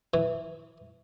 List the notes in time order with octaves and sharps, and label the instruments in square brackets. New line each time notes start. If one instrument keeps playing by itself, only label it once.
[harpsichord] E3